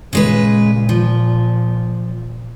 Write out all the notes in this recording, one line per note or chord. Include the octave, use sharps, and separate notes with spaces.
A#2 C#3 G#3 B4
F3